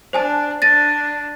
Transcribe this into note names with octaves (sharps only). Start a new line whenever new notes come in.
D4 C5 G#5 A5
D4 A6 A#6 D#7